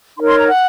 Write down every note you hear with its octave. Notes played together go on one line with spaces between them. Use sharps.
D#4 A#4 C#5 C6
C6
A#5
F#5